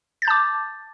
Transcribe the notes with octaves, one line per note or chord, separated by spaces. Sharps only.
A5 D6 G6 A6